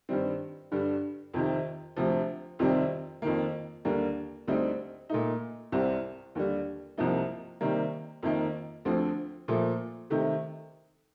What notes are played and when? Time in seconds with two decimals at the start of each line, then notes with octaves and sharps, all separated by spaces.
0.09 G2 D#3 G3 C4
0.72 G2 D3 G3
1.34 F2 C3 D#3
1.96 D2 C3 F3
2.59 F2 C3 D#3 G3 C4
3.22 F2 D#3 A#3
3.85 D#2 D3 G3 A#3
4.47 D2 D3 G3 C4 D#4
5.10 A#2 A3 D#4
5.72 C2 C3 G3 C4
6.35 D#2 D3 G3
6.98 C2 C3 F3 A#3 D#4
7.61 C3 D#3 G3 A#3
8.23 F2 D#3 A#3 D#4
8.85 D2 D3 F3 C4
9.48 A#2 F3 A3
10.10 C3 D#3 A3